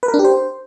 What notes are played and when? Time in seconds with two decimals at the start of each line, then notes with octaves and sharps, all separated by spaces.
0.03 B4
0.08 A#4
0.14 D4
0.19 G4
0.25 C5